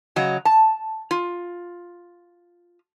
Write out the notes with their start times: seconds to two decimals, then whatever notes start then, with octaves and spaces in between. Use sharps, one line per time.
0.16 C#3 F#3 D#5
0.45 A5
1.11 F4